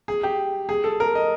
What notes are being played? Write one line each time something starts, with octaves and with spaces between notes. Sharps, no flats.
G#4
G4
G#4
A4
A#4
D#5